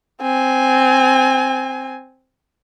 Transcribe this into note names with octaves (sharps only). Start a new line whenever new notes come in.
C4 G#5